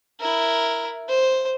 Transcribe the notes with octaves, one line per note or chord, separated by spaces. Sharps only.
E4 A#4
C5